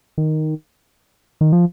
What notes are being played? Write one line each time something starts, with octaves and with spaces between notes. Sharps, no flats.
D#3
D#3
F3